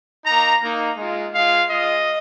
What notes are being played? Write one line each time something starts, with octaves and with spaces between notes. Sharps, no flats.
A#3 D#4 A#5
A#3 D#4
G#3 F4
G#3 F4 F5
G#3 F4 D#5